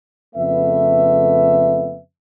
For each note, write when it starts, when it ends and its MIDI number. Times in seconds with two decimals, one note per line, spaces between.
0.35 1.98 41
0.35 1.98 49
0.35 1.98 57
0.35 1.98 59
0.35 1.98 71
0.35 1.98 76